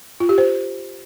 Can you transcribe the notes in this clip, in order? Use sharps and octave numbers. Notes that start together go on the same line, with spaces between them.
F4
G4
C5